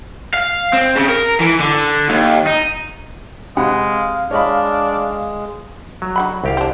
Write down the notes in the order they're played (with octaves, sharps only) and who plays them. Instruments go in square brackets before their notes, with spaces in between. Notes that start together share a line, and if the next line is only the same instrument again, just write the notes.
[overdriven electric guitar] F5
C4
C#3
A#4
E3
D3
D#2
D#4
[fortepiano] C3 F#5 B5 [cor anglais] G#3 [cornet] F5
[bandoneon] G#3 [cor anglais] D4 [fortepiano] C#5 D#5 B5
[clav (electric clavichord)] F#3
[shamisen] D3 F#5 B5
[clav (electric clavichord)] C2 G4 F5
[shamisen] C4 D4